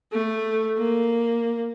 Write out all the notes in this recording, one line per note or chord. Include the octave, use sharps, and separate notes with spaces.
A3
A#3